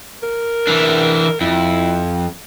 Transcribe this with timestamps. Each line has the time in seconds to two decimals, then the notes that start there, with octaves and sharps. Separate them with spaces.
0.23 A#4
0.67 E3 D4
1.41 F2 E4